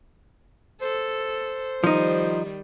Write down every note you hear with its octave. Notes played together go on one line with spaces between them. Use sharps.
A4 C5
D#3 F3 G3 D#4